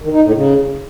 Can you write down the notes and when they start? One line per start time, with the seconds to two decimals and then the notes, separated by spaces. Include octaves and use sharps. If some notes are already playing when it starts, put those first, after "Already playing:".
0.02 D#3
0.12 D#4
0.23 A2
0.34 C#3